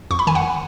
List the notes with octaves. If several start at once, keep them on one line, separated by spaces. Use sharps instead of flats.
F2 C#6
B5
D#3 G#5
F#5